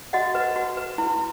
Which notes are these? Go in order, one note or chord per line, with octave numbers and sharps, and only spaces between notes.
F#4 D#5 F#5
B4
F#4
B4
E4